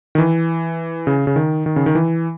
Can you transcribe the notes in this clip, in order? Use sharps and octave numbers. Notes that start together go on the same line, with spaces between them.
D#3
E3
C#3
C#3
D#3
D#3
C#3
D#3
E3